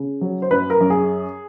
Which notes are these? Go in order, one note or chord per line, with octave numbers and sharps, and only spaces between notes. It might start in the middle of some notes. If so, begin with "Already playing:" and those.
Already playing: C#3
F#3
C5
F#2 B4
A#4
F#2
G#4